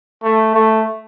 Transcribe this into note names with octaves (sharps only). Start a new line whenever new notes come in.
A3
A3